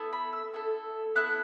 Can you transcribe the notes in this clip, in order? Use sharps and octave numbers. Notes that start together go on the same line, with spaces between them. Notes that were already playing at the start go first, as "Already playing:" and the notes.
Already playing: B3 E4 A4
B5
E6
B3 E4 A4
B3 E4 A4 F#6